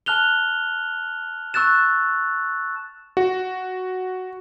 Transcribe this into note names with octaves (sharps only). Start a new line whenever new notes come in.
A5 F6 F#6 F7 G7
C#6 E6 F#6 A6 E7
F#4